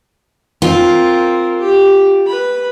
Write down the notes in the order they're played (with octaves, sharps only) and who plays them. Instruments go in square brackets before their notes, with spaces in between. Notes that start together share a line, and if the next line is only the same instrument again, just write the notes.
[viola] C4 A#4 [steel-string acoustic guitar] F4
[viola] G4
B4 B5